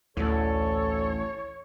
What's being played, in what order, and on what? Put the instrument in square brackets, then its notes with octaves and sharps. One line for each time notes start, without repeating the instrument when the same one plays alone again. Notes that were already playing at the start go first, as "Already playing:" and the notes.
[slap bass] A1 E3 [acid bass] D2 [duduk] A4 [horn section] C#5